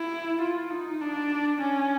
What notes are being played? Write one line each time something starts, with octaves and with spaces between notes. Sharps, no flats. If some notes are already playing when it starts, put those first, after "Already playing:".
Already playing: E4
F4
D#4
D4
C#4